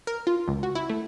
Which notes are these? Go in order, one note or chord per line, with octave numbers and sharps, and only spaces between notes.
A#4
F4
C#2
F#4
E4
A3